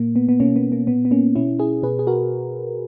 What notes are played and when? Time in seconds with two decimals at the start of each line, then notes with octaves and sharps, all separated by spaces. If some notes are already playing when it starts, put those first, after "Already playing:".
Already playing: A#2 A#3
0.16 B3
0.29 B3
0.40 B2 A#3 C#4
0.56 B3
0.72 A#3
0.87 A#2 B3
1.05 B3
1.11 A#3 C#4
1.35 B2 C#4 E4
1.59 E4 G#4
1.83 B2 G#4 B4
1.99 G#4
2.07 F#4 A#4